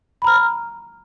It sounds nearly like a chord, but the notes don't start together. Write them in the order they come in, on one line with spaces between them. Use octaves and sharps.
B5 A#5 F6